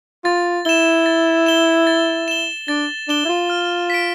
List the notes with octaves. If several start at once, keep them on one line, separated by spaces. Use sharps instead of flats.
F4 A6
E4 E7 G7
A6
E7 G7
A6
E7 G7
D4 A6
D4 E7 G7
E4
F4
F6
B6 D7